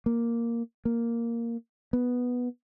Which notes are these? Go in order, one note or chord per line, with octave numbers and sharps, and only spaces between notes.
A#3
A#3
B3